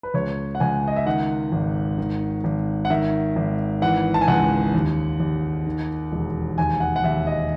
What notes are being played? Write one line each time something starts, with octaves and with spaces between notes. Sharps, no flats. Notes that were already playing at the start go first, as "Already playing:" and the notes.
B4
C#2 C#5
F#5
C#2 G#5
D#5
E5
D#3 F#5
G#1
D#3
G#1
F#5
D#3 E5
G#1
E3 F#5
A5
G#5
C#2 F#5
D#2
D#2
D#3
E1
D#2 G#5
F#5
F#5
D#2 E5
D#5